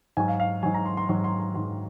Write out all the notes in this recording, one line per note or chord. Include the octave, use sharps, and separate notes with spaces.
G#2 F#3 G#5
F5
F5
G#2 F#3 G#5
A#5
C6
C6
G#2 F#3 C6
C6
C6
G#2 F#3 C6